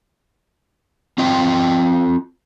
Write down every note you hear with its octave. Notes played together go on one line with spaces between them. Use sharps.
C4 F4 D#5 G5